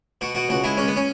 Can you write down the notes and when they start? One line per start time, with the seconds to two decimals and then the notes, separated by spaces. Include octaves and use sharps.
0.21 B2 F#4
0.35 B2 F#4
0.49 C#2 F#4
0.64 G#3 E4
0.77 C#2 C#4
0.88 B3
0.96 C#4